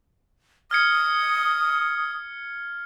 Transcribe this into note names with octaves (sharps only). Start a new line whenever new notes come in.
D#6 F6 G#6 C#7